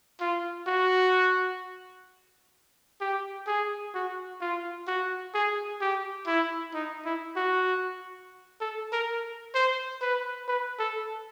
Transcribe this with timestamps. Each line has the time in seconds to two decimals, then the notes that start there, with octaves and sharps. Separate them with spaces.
0.21 F4
0.67 F#4
3.01 G4
3.47 G#4
3.94 F#4
4.41 F4
4.87 F#4
5.34 G#4
5.81 G4
6.27 E4
6.74 D#4
7.05 E4
7.36 F#4
8.61 A4
8.93 A#4
9.55 C5
10.01 B4
10.48 B4
10.79 A4